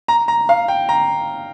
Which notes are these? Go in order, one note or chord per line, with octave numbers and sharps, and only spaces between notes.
A#5
A#5
F5
G5
A#5